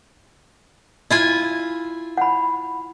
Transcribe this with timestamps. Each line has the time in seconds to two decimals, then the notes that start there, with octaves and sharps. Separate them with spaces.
1.11 E4 F4 G#5
2.17 F#5 B5